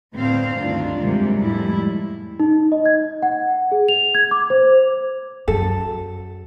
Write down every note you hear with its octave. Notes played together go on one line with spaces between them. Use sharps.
D2 A2 B3 C4 C5 F5
D2 G2 D#3 D4 F4
G#2 C3 F#3 G3 A#3
F2 A2 G3 G#3 E4
D#4
D#5
G#6
F#5
G#4
F7
G#6
D6
C5
F#2 A4